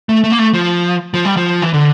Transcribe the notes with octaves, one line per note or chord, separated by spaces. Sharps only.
A3
A3
A#3
A3
F3
F3
G3
F3
E3
D3